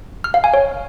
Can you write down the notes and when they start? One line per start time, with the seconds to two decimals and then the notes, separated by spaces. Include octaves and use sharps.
0.24 F6
0.34 F5
0.44 G#5
0.54 C#5